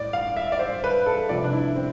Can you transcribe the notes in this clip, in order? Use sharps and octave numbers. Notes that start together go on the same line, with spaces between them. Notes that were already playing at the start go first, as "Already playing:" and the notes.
Already playing: A2 D5
F5
E5
D5
C5
B4
A4
C3 F3 D5
D4
E4
C4